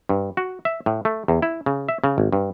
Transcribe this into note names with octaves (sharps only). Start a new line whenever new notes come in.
G2
F#4
E5
A2
A3
E2
E4
C#3
E5
C#3
G#1
G2